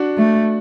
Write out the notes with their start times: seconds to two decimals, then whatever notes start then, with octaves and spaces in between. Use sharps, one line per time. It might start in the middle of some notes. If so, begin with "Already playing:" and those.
Already playing: D4 F#4
0.18 A3